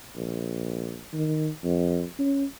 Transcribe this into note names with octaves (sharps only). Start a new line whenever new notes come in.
A#1
D#3
F2
C#4